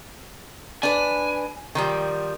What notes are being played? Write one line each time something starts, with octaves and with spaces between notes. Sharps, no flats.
D4 B4 G#5
D#3 F3 G3